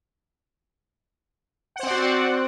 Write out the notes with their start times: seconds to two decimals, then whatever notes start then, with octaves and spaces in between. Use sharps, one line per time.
1.76 F#5
1.79 C5
1.83 C4
1.87 D5
1.91 F#4